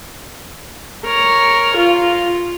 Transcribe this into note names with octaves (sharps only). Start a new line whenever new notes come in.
A#4 C#5
F4